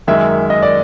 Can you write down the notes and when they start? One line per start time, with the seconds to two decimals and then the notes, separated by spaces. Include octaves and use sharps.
0.07 F#2 D#3 G#3 E5
0.50 D#5
0.62 D5